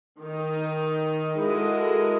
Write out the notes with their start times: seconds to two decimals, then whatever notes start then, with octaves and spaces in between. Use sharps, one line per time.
0.21 D#3 D#4
1.40 G#3 E4 F#4 A4 A#4 D#5